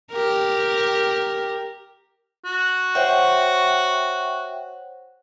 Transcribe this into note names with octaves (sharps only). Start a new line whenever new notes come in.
G4 A#4
F#4
C5 C#5 E5 F#5 G5 C#6